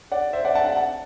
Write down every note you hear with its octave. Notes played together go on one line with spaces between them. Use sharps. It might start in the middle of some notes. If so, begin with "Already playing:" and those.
D5 F#5
C5 E5
D5 F#5
F#5 A5
F#5 A5
F#5 A5